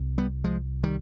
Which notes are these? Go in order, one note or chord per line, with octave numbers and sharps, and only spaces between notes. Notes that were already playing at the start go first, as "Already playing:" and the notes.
Already playing: C2
G3 B3
F3 G#3
D#3 G3